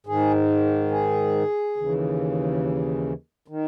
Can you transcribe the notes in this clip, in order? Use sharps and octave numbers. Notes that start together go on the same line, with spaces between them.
G#2 D#3 G#4
G#4
D#2 C#3 E3
D#3